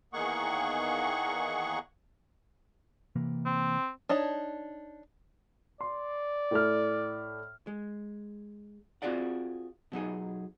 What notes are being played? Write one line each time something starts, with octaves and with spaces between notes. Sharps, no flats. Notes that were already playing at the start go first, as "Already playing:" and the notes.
E2 D#3 A#3 G#4 F#5 C#6
C3 E3 A#3
C4
D4 D#4 C#5 A5
D5 C6
A2 A3 F6
G#3
C4 F4 F#4 G#4 D5 F#5
B2 F#3 D#4 G#4